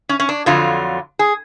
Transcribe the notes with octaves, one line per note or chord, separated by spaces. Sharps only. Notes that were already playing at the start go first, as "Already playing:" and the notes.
C#4
C#4
D4
F2 D3 F#3 F4
G#4